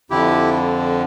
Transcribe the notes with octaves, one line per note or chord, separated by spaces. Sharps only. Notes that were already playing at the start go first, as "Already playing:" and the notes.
F2 D3 F3 E4 G4